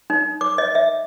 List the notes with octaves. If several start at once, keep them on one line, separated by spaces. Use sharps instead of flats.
D#4
D6
D#5
E5